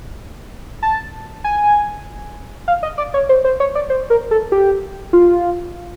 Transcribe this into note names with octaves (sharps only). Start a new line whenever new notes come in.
A5
G#5
F5
D#5
D5
C#5
C5
C5
C#5
D5
C5
A#4
A4
G4
F4